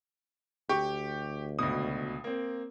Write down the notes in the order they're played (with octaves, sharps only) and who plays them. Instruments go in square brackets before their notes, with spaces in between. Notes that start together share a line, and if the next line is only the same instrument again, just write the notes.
[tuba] D2 [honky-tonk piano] G4 [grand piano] C#6
[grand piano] C#2 B2 [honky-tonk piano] D#6
[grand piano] A#3 C4